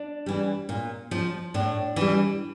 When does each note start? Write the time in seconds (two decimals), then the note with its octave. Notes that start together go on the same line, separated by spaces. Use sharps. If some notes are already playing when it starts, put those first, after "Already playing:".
Already playing: D4
0.26 E3 G3
0.69 A#2
1.11 F3
1.54 A2 D4
1.96 E3 G3